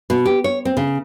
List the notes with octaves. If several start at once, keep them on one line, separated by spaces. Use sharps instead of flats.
B2
G4
C#5
C4
C#3